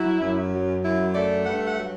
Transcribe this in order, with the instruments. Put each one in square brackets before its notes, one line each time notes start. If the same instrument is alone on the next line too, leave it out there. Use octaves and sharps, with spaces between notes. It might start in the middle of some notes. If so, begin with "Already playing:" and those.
Already playing: [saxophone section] F#3 E4
F#2
F#3
F#2 E4
A3 D5
G2 F#5
F#5
F#3